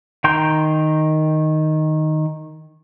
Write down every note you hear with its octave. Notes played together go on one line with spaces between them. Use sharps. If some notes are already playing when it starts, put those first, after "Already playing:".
D#3 G5 A#5 C6 G6